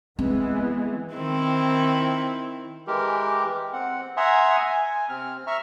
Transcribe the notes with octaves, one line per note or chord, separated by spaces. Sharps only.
E3 G#3 B3 C4
D#3 C4 E4
E3 G#3 G4 A#4
C4 F#5
E5 F#5 G#5 A#5 C6 D#6
G#5
C3 C4 F6
E5 A#5 C#6 F6